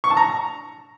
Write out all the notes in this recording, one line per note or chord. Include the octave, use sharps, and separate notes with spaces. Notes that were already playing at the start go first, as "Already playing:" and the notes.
C#6
A5
A#5